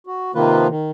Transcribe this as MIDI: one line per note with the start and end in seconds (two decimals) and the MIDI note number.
0.07 0.32 66
0.35 0.67 48
0.35 0.67 51
0.35 0.67 53
0.35 0.67 58
0.35 0.67 65
0.35 0.67 71
0.69 0.91 51